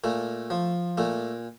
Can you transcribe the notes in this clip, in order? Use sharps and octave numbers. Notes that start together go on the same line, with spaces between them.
A#2 A3
F3
A#2 A3